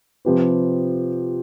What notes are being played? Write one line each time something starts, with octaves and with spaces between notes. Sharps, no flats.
C3 F3 C4 G4 B4